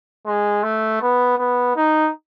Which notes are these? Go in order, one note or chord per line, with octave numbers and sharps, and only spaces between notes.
G#3
A3
B3
B3
D#4